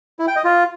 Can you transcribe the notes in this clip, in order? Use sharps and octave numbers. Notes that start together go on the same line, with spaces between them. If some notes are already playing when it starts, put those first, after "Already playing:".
E4
G5
D#5
F4